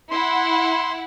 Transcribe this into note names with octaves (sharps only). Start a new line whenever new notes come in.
E4 F#5 C6